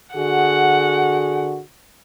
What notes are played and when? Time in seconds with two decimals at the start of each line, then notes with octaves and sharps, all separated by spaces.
0.16 D3 F#4 G#4 F#5